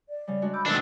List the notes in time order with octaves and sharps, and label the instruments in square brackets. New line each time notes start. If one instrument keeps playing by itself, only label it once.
[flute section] D5
[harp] C#3 G3
G#3 D4 F#4
[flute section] B5 E6 G6 [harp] D6
[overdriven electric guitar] B1 D4 [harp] E2 G#2 D#3 [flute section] E6